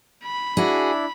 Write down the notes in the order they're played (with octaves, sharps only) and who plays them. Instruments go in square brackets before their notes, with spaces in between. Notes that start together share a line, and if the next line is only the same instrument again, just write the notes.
[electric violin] B5
[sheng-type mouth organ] D4 E4 [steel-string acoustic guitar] F#4 G#4